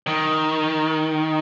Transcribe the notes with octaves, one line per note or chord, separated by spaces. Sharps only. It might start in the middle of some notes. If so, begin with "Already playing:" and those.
D#3